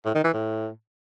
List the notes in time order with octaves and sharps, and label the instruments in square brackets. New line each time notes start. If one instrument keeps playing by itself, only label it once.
[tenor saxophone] A2
D#3
E3
A2